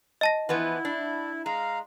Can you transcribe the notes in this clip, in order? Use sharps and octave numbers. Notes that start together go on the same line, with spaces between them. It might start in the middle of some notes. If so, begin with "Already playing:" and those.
D#5 A5 A#6
E3 F3 B3 E4
D4
G#3 F5 A#5